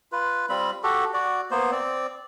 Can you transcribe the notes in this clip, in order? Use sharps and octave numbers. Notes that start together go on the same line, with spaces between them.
F4 B4
G3 C4 F4 B5
F#4 G4 A4
F#4 D5
A#3 B3 C5
C4 D5